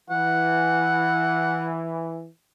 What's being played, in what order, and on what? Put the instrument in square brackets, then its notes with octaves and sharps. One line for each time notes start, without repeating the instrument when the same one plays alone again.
[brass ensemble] E3 [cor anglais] F#5